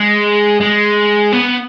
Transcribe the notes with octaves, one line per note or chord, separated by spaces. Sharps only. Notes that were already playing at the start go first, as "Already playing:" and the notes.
Already playing: G#3
G#3
B3